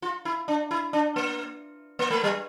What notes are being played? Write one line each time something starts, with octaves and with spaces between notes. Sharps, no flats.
F4
E4
D4
E4
D4
A#3
A#3
A3
G3